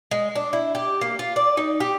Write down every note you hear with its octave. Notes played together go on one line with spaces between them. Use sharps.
G#3
D4
E4
G4
A#3
F4
D5
D#4
G4